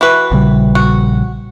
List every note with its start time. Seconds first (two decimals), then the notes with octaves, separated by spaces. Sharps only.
0.01 E3 F#4 B4
0.31 A#1 C#3 G3
0.75 F#4